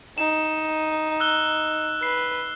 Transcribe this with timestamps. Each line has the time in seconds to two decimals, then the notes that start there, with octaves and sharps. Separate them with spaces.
0.18 D#4 E7
1.20 E6 F#6 G7
2.03 B4 C7